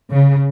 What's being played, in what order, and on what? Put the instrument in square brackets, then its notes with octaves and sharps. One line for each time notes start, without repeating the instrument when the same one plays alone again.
[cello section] C#3